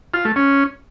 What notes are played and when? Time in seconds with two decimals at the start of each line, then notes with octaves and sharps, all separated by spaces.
0.14 F4
0.25 A3
0.36 C#4